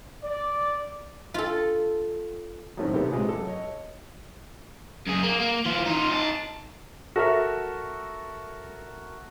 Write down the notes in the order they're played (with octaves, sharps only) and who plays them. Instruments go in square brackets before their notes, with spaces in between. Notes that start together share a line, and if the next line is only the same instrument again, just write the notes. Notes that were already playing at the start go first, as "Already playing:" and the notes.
[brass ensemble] D5
[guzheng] F4 A4
[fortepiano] F#2 A2 D#3 A3 C4 C#4
C3 D#3 A#3 B3 G4 A4
A2 C3 G#3 B3 F4 G#4
F#2 A4
C#5 D#5
[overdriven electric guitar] F#2 G#4
A#3
A#3
E3 F4
D#4 F4
D#4 A5
[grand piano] F#4 A4 A#4 E5